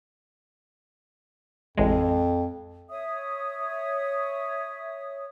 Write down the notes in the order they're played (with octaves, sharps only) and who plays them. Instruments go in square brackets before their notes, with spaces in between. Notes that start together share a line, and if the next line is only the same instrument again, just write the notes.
[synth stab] A1 G#3 [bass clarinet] F2
[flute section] C#5 E5 D#6